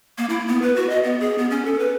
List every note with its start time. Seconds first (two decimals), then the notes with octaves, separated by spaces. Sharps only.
0.18 A#3
0.29 E4
0.48 B3
0.62 B4
0.76 F#4
0.89 D#5
1.03 B3
1.20 G#4
1.38 B3
1.50 C#4
1.65 A4
1.79 B4